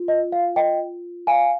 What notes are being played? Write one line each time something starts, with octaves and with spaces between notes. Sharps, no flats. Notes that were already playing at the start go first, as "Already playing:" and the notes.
Already playing: F4
D#5
F5
D#5 G5
F5 G#5